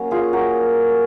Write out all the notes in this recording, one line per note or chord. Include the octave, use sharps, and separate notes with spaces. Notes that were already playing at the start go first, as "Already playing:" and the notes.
Already playing: F#3 A#3 C#4
F4 G#4
F#4 A#4